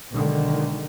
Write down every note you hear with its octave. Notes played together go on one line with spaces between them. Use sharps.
B1 D3 D#3 G#3